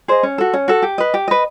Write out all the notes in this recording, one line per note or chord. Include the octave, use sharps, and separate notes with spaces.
G#4 C5 D#5
C#4
F#4 A4
C#4
F#4 A4
G4
B4 D#5
G4
B4 D#5